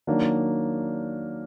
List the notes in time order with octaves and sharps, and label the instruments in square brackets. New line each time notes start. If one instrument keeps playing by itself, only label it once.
[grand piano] D#3 F#3 A#3 D4